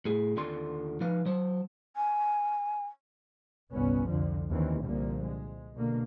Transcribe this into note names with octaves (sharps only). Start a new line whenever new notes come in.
A2 G#4
D#2 D3 F4 A4 C6
F3 D#4 B4 F5
F#3 C5
G#5
G1 C2 B3 C#4
C2 F2 D3 F3
D#2 E3 C4 C#4
C2 A#2 D3 F3 A#3
G#3
B2 D3 A#3